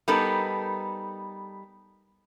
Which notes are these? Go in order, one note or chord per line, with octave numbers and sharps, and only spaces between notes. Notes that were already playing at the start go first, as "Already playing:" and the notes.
G3 B3 D#4 A4 A#4